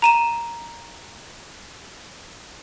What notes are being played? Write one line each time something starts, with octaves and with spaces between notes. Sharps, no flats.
A#5 D#7 E7